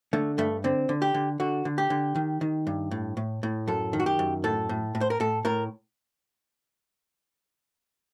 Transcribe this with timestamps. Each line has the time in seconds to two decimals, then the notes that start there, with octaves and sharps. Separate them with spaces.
0.13 D3 A3
0.38 G2 A3
0.64 D3 C4
0.89 D3
1.02 G4
1.14 D3
1.40 D3 F#4
1.65 D3
1.78 G4
1.90 D3
2.15 D#3
2.41 D#3
2.67 G2
2.91 A2
3.17 A2
3.43 A2
3.68 F#2 A4
3.93 D#3
4.00 F#4
4.06 G4
4.19 F#2
4.44 A2 A4
4.69 A2
4.95 A2
5.01 C5
5.10 A#4
5.20 A2 A4
5.45 A2 A#4